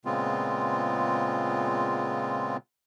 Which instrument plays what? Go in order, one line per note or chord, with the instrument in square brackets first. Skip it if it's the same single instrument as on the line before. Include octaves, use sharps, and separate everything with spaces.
[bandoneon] A#2 C#3 G#3 B3 C4 F4